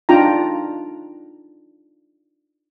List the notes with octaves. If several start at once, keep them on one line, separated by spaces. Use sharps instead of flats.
D4 D#4 F4 G5 A#5